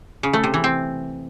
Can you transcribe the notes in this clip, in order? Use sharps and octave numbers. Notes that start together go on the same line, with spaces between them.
C#3
A3
C3
E3
C4